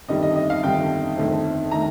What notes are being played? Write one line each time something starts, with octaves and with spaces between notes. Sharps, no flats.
G1 F2 D#3 G3 D#5
D#5
D#5
F5
G1 F2 D#3 G3 G5
G1 F2 D#3 A3 C4
D#3 A3 A#5